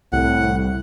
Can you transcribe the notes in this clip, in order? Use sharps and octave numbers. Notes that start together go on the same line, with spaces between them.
C2 A2 F#5